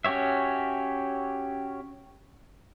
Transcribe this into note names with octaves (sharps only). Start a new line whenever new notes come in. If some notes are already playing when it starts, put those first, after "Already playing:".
C#4 F#4 G4 C#5 E5